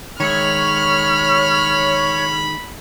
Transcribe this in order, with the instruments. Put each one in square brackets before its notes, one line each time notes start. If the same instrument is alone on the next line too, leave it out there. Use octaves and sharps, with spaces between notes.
[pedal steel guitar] D#3 G#3 E5 [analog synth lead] C#5 [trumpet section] B5 [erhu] F6